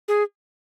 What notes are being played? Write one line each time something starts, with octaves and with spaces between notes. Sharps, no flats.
G#4